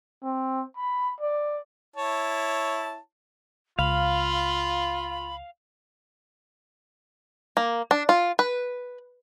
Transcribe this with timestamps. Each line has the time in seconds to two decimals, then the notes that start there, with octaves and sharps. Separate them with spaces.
0.23 C4
0.77 B5
1.20 D5
1.96 E4 C#5 A5
3.79 C#2 F4 F5 B5
7.57 A#3
7.91 D4
8.09 F4
8.39 B4